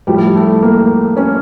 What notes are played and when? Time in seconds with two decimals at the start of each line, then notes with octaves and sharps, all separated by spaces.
0.07 A2 F3 G3
0.35 A3
0.62 A#3
1.17 C#4